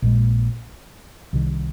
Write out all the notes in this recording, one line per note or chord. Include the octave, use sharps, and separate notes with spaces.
A#1 A#2 G#3
C2 C3 D#3